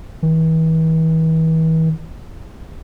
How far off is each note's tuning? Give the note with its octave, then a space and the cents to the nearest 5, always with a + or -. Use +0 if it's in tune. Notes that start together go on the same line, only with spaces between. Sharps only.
E3 -40